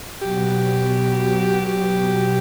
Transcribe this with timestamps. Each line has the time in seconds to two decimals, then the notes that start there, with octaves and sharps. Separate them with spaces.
0.22 B2 F#3 B3 F#4 G4
1.65 G4